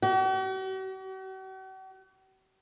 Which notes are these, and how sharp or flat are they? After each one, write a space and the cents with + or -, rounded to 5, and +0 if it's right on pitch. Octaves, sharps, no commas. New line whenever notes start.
F#4 +45